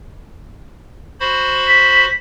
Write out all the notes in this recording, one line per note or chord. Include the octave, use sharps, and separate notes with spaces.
F#4 C5 B5
B6